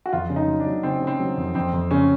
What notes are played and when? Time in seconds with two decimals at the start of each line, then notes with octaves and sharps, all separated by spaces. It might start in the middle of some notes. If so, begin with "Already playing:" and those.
0.06 F#4
0.13 F2 F4
0.30 C#3
0.36 D#4
0.48 F#3
0.60 D4
0.66 F#3
0.83 C#3 C4
1.02 C#3 C4
1.20 F#3
1.37 F2
1.55 F2 C4
1.73 F2
1.91 C#3 C#4